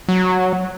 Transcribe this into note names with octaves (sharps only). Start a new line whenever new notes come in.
F#3